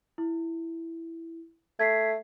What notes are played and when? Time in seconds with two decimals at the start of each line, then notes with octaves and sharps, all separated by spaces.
0.18 E4
1.79 A3 G#6 B6 C7